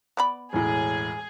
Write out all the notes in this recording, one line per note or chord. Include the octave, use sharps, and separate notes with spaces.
B3 D5 B5
E1 A2 G#4